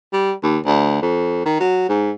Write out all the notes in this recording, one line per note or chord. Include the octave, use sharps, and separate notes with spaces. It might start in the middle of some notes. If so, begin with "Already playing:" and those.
G3
D#2
D2
F2
D#3
F#3
G#2